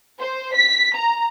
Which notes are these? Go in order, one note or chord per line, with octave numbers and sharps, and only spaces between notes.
C5
B6
A#5